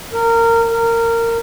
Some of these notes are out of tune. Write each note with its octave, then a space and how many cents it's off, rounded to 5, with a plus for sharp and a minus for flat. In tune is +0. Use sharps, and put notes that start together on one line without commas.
A#4 -20
A#4 -20